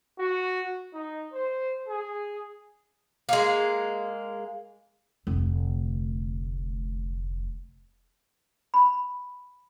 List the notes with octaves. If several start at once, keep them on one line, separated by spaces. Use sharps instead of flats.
F#4
D#4
C5
G#4
G#3 A#3
F1 D2
B5